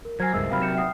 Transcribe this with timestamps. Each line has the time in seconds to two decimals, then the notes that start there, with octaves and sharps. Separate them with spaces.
0.05 A#4
0.20 F#3 C5 G#5 F6 G#6 C7
0.34 C#2 G2 G#3 A#4 E5 E6
0.50 C3 F#3 F5 G5 B5 F6
0.62 G6 C#7 E7
0.75 E5 F#5 G5 D#6 C7